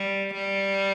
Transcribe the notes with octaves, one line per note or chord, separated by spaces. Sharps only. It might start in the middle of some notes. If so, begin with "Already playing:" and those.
Already playing: G3
G3